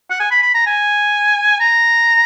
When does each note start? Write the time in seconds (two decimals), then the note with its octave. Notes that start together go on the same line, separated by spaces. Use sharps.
0.11 F#5
0.20 G#5
0.31 B5
0.43 B5
0.55 A#5
0.67 G#5
1.60 A#5